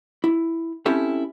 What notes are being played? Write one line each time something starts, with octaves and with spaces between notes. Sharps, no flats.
E4
C4 C#4 E4 G4 A4